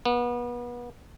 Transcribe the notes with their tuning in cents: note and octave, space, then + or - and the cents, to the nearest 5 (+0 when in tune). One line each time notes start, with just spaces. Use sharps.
B3 -30